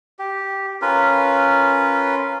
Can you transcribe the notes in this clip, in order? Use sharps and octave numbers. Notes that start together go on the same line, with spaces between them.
G4
C#4 F4 A#4 B4